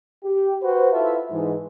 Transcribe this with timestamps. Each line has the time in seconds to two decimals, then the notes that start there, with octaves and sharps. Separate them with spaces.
0.24 G4
0.63 F#4 B4 C5
0.93 E4 F4 A4 B4 E5
1.31 G#2 E3